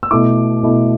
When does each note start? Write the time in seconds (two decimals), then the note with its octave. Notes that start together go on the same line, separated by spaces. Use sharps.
0.03 E6
0.11 B2 A3 E4 D6
0.63 B2 A3 E4